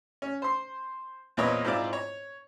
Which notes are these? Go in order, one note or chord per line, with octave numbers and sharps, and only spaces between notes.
C#4
C5 C6
E2 A#2 C4 B4 C#5 D#5
G#2 C4 E4 F4 D5 D6
C#5